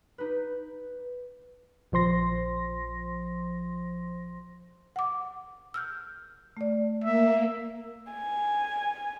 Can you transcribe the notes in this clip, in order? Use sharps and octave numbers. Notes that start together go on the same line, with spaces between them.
D#4 G4 B4
A#1 F3 C5 C6 A#6
F#5 D6
E6 F6 G6
A3 D5
A#3 E5
G#5